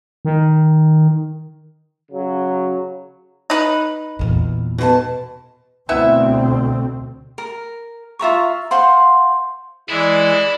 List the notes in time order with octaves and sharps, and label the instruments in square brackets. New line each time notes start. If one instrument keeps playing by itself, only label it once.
[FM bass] D#3
[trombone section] C#3 F#3
[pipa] D#4 B4
[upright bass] E2 A#2
[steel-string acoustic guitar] B2 C5 A5
[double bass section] D2 B2 C4 [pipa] B3 E4 E5
[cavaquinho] A#4
F4 E5 A#5 C#6
C5 F5 F#5 C6
[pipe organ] E3 G#3 [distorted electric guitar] E4 [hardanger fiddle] D5